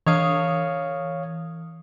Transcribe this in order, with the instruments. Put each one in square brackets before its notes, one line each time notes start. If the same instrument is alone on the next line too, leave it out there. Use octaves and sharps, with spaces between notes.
[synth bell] E3 D#6 [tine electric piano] C#5 F5